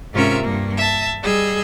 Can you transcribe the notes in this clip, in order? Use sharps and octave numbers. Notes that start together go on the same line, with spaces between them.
G#2 C3 C#4 F4 A#4 E5
G2 A#3
E5 A5
G3 G#4 D#5 E6